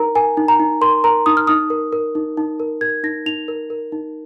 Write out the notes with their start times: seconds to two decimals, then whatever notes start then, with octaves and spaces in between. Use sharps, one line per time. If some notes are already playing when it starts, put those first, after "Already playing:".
Already playing: D#4 A#4 A#5
0.15 A#4 G#5
0.37 D#4
0.48 A#5
0.60 D#4
0.81 A#4 C6
1.04 A#4 A#5
1.26 D#4 D#6
1.37 F6
1.47 D#4 D#6
1.70 A#4
1.92 A#4
2.15 D#4
2.37 D#4
2.60 A#4
2.81 A#4 G#6
3.04 D#4 A#6
3.26 D#4 F7
3.48 A#4
3.70 A#4
3.92 D#4